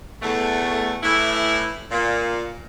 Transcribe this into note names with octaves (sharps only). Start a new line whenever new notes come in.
E2 A3
A2 E3 E4
A#2